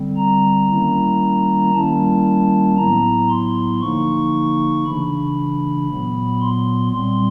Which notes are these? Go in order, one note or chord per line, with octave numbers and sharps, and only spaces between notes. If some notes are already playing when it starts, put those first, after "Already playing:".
Already playing: D3 G3 C4
A#5
D#3 G3 A#3 C#4 E4
D#3 G3 A#3 C#4 E4 A5
A2 F#3 B3 E4 A#5
C6
D3 F3 A#3 D#4 C#6
C#3 E3 A3 D4 B5
A#2 F#3 B3
C6
A#2 G3 C4 C6